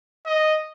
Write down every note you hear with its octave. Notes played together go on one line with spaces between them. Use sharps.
D#5